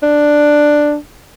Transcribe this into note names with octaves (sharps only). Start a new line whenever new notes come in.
D4